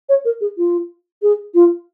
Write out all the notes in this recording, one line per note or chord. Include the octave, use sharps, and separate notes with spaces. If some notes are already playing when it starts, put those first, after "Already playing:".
C#5
A#4
G#4
F4
G#4
F4